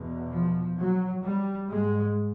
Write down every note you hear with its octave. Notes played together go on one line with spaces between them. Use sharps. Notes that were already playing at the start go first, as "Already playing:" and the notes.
Already playing: E2 B2
F3
F#3
G3
G#2 G#3